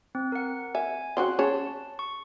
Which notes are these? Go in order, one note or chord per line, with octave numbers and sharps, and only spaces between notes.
C4
A#4 F#5
E5 G#5
C#3 C4 F#4 C6 F#6
C#4 G#4 C#5 A5
C#6